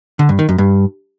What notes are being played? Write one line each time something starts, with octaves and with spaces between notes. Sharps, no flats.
D3
G2
D#3
F#2
G2